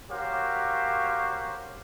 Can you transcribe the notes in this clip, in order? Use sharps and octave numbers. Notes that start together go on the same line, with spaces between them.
F#4 G4 A#4 C5 C#5 F5